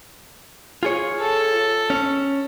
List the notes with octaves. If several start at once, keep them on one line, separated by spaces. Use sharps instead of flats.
F4 G#4 C#5
A4
C#4